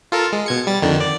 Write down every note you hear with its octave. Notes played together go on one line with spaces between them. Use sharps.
F4 A4 A#4
G#3
B2 G#6 C#7
G3 A6
F2 D3 D#3
D5